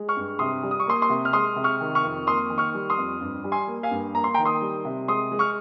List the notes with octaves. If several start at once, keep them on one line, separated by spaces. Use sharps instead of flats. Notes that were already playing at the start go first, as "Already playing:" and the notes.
Already playing: G#3
C#6 F6
G2
C3 C6 D#6
G3
D#6
C#6
A#3 C6 D#6
C6 D#6
C3
F6
G#3 C6 D#6
C3
C#6 F6
D#3
C#6 F6
F2
A#3 C6 D#6
D#3
C#6 F6
G3
C6 D#6
F2
G2
G3
G#5 C6
A#3
F5 G#5
G2
A#3 A#5
C6
G5 A#5
D#3
C6 D#6
G3
C3
G#3 C6 D#6
G#3
C#6 F6